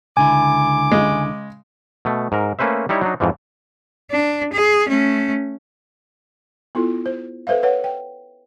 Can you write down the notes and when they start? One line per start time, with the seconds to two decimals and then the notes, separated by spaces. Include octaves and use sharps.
0.17 C#2 D3 E4 G#5 D6
0.92 C#3 G#3
2.05 B2 A3
2.32 G#2 A#4
2.59 A3 A#3 C#4 B4 C5 E5
2.89 G3 D#4 E4 C#5
3.01 F#3 D4 D#4
3.20 F2 G#2 E3 F3
4.10 D4
4.53 G#4
4.88 A3 C#4
6.75 B3 E4 F4 A4
7.06 C5
7.47 A4 B4 C5 E5 F5
7.63 B4 C#5 F#5
7.84 G5